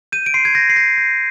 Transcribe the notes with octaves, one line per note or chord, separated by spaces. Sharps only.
G6 D#7
D7
C6 C7
G#6
G6 A#6
C7
G6 A#6
G6